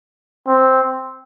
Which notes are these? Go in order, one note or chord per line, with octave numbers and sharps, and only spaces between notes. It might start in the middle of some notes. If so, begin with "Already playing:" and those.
C4